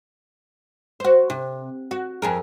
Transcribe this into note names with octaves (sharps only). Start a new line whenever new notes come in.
F#4 C5
C3
F#4
F2 G#4 A#4